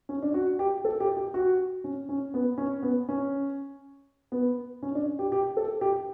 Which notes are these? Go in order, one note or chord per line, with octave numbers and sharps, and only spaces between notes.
C#4
D4
F#4
G4
A4
G4
G4
F#4
C#4
C#4
B3
C#4
B3
C#4
B3
C#4
D4
G4
G4
A4
G4